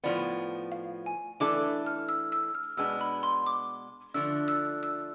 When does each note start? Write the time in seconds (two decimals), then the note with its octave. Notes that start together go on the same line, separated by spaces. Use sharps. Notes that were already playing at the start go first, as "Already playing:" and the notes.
0.04 A2 F3 B3 D5
0.72 F5
1.06 G#5
1.40 E3 A3 D4 A4 D6
1.86 F6
2.09 E6
2.32 E6
2.55 F6
2.77 B2 G#3 B3 D4 E6
3.01 B5
3.23 C6
3.46 D6
4.14 D3 F3 A3 D4 E6
4.48 E6
4.83 E6